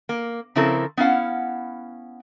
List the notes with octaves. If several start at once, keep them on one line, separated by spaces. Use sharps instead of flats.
A#3
C#3 F3 C4 E4 A4 A#4
B3 C#4 E4 F5 F#5